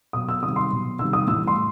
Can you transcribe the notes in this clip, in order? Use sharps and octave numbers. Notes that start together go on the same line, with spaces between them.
B2 F#3 D#6
E6
C3 D#3 G3 D#6
C6
B2 F#3
C3 D#3 G3 E6
D#6
A2 E3 G3 E6
C6